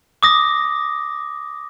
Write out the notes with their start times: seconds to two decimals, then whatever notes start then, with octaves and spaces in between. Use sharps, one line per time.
0.23 D6 D#6 A#6